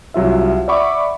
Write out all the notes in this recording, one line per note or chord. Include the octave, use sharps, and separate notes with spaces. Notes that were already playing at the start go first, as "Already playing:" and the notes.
C2 F#3 F4 E5
D5 E5 F#5 B5 C#6 D6